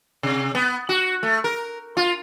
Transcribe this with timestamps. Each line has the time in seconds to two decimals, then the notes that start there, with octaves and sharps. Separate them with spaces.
0.23 C3
0.55 B3
0.89 F#4
1.23 A3
1.44 A#4
1.97 F4